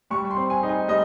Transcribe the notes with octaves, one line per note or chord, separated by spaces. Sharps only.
G3 C#6
C6
C4
G#5
D#4
G#5
G3 D#5